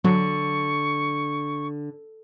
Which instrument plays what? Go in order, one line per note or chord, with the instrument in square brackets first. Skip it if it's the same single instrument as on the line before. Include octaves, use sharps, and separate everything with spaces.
[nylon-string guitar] D3 [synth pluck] F#3 [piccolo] C#6